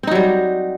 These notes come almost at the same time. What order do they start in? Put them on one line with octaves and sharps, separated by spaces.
C4 D#4 F#3 G3